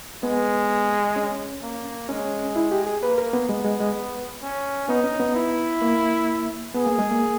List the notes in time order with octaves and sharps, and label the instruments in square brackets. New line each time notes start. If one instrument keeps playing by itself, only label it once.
[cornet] G#3 [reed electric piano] B3
[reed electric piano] C#4
[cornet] A#3
[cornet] G#3 [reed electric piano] C#4
[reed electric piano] E4
G4
G#4
[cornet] A#3 [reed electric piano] B4
[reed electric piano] A#4
B3
[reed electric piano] G#3 [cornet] B3
[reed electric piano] G#3
G#3
[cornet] C#4
[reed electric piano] B3 [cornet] D#4
[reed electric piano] C#4
B3
[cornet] E4
[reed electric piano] A#3
[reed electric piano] B3 [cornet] G#4
[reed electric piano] A#3
G#3
A#3